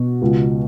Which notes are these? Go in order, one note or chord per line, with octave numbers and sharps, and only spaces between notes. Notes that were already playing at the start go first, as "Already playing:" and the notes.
Already playing: B2 F#4
C#2